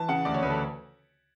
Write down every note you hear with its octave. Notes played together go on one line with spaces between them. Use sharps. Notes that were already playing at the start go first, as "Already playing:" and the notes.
Already playing: E3 A5
C#3 F#5
D2 D5
C#5
D2 B4
A4